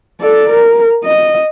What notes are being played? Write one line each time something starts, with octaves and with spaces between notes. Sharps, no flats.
A4 D5
A#4
D#5